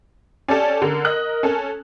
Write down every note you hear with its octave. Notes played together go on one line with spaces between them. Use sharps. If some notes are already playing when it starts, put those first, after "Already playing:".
C#4 G4 A4 D5
D3 A#4
D#5 F#6
C#4 A4